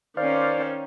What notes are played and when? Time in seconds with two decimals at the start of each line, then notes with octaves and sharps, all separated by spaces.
0.17 D#3 C#4 C5 D5 F5